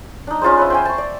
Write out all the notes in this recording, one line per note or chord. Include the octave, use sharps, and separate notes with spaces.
D4 D#4
C#4 F4 G#4 C5
B4 C#5 E5
C5 G5 G#5
A5 C#6
D5